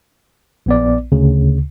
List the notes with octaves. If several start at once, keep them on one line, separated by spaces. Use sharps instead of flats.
A#1 B3 D5
D2 C#3